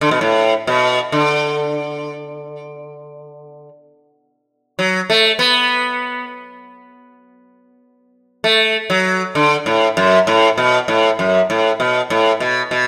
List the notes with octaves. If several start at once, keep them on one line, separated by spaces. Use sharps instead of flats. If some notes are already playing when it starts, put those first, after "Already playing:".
D3
B2
A2
B2
D3
F#3
A3
B3
A3
F#3
D3
A2
F#2
A2
B2
A2
F#2
A2
B2
A2
B2
B2